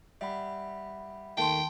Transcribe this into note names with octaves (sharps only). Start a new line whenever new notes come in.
G3 E5 F#5 B5
D#2 A3 G5 A5 C6